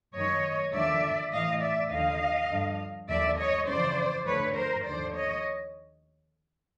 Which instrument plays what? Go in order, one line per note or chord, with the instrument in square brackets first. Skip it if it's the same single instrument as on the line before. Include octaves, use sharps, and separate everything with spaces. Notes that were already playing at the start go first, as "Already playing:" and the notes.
[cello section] F#2 D#3 C#5 D#5
D#2 D3 F3 D5 E5
A2 E3 D#5 F5
D5 E5
D#2 D3 F3 D#5 F5
G2 D3 F3
D#2 D3 F3 D5 E5
C#5 D#5
F2 C#3 E3 C5 D5
D2 D3 F3 B4 C#5
A#4 C5
D#2 D3 F3 C5 D5
C#5 D#5